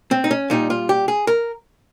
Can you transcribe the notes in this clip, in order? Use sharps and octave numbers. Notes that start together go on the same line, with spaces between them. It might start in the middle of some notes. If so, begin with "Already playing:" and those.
C4
D#4
C#4
A#2 G3 D#4
F4
G4
G#4
A#4